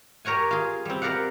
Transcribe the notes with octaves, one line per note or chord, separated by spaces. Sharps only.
G4 A#4 C#5 F#5 G#5
F4 G#4
G3 C4
G4 A#4 D5 F5 F#5